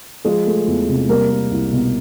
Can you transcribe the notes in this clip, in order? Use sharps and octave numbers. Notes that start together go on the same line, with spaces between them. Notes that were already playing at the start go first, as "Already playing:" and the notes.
F3 G#3 G#4
A3
E2
C3
G3 A#3 A#4
A#3
C2
B2